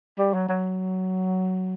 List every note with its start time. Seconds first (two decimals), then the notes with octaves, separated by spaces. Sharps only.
0.18 G3
0.34 F#3
0.49 F#3